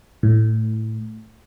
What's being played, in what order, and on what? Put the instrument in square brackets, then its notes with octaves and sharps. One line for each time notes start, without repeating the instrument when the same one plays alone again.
[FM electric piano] A2